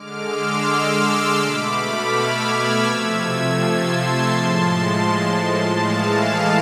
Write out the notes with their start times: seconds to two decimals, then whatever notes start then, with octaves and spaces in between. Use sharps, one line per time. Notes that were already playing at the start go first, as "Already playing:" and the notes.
Already playing: D3 G#3 D6 F6
0.27 C6 E6
0.64 C6 E6
1.37 B2 A3 B5 D6
1.74 D6 F6
2.10 E6 G#6
2.48 D6 F6
2.84 C3 F3 A3 E6 G#6
3.21 E6 G#6
3.58 A5 C6
4.31 A2 F3 G#3
5.78 A2 E3 G#3 F5 A5